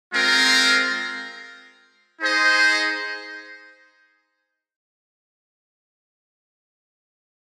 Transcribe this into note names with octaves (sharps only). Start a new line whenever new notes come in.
G#3 C4 F4 A#4
D#4 G#4 C5 D#5